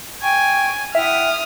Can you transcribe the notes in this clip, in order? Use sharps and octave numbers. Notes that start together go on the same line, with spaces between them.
G5 G#5 C#6
E4 E5 F#5 G5 D#6 F6